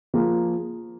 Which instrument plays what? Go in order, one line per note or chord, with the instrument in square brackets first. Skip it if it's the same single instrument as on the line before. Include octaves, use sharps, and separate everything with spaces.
[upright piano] F3 A#3 F4 G#4